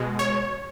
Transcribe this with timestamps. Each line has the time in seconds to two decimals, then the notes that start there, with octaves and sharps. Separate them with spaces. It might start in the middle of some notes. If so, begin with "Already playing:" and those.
Already playing: B2 G#3
0.19 C#5